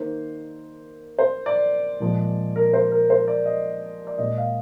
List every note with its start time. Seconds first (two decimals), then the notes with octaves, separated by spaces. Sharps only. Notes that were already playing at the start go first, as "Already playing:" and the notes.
Already playing: D#3 A#3 C5
1.19 C5
1.46 D5
2.00 A#2 F3 G#3
2.56 A#4
2.74 C5
2.92 A#4
3.10 C5
3.28 D5
3.46 D#5
4.07 D5
4.18 A#2 G#3 D#5
4.38 F5